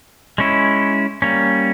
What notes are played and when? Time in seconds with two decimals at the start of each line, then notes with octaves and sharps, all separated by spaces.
0.38 G#3 C#4 E4
1.22 G3 A#3 C#4